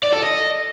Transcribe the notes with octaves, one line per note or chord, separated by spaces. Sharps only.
D5
A4
D#5